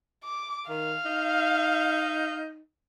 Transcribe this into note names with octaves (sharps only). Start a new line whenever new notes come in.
D6
D#3 F5
D#4